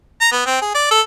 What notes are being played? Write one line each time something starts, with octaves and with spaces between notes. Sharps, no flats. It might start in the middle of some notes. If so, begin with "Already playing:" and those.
A#5
B3
C4
G#4
D5
A4